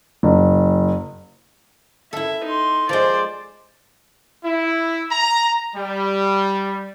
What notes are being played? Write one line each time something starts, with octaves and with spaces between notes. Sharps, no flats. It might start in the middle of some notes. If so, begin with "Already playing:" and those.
F#1
E4 A4 E5
D#4 C6
F3 G#3 C5 D5
E4
A#5
G3